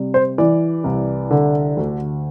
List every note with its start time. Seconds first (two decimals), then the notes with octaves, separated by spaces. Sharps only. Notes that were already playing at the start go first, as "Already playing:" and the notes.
Already playing: C3 G3
0.14 C5
0.38 E3 D5
0.84 C2
1.31 D3
1.77 D2